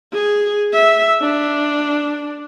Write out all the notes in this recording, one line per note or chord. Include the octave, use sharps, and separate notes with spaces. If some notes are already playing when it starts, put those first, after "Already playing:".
G#4
E5
D4